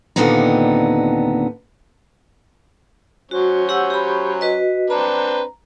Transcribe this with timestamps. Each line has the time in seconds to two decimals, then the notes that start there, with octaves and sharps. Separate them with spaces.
0.16 D#2 A#2 D3 B3 C4 D#4
3.31 F#3 C#4 F#4 C5
3.69 G4 F#5 E6
3.90 G4 B5
4.41 F#4 B4 D#5
4.90 C4 D4 B4 A#5